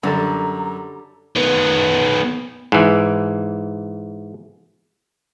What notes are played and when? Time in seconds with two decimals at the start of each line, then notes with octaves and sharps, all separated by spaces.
0.03 F#2 D3 F#3 G3 A4 A#5
1.36 D#3 B3
2.72 G#2 E3